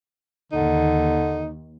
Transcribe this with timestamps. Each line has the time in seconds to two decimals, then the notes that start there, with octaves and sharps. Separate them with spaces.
0.52 D#2 D3 D#4